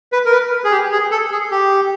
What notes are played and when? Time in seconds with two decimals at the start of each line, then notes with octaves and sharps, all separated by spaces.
0.12 B4
0.25 A#4
0.32 B4
0.64 G#4
0.71 G4
0.92 G#4
1.11 A4
1.31 G#4
1.51 G4